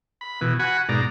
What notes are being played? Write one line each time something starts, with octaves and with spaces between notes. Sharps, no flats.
B5
B2 E3
F#4 F#5 G#5 B5
G#2 B2 D5 A#5